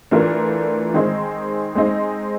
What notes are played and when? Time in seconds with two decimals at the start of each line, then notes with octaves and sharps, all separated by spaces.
0.11 E3 A3 D4 F4 A#4
0.94 D#3 G#3 C4 D#4
1.75 G#3 C4 D#4